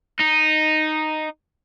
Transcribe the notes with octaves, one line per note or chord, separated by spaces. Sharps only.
D#4